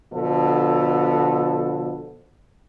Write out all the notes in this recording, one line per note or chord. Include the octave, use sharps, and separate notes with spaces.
B2 D3 F3 A4